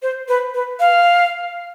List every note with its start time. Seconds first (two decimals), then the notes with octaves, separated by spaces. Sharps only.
0.02 C5
0.28 B4
0.54 B4
0.80 F5